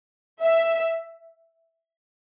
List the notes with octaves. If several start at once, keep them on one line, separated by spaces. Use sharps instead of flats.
E5